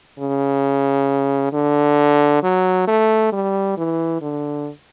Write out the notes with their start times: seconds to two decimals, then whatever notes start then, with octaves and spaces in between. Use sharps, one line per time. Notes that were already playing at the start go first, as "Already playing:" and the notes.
0.19 C#3
1.53 D3
2.43 F#3
2.87 A3
3.32 G3
3.77 E3
4.22 D3